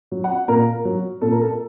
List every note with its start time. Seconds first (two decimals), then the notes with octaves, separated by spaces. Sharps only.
0.11 F#3
0.24 F#5
0.48 A#2 A#4
0.85 F#3
1.21 A#2 A4
1.32 A#4
1.41 A4